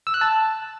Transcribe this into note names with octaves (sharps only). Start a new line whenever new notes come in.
E6
F#6
A5